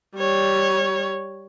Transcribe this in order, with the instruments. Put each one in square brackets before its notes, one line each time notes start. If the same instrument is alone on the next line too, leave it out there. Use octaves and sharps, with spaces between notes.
[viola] G3 C#5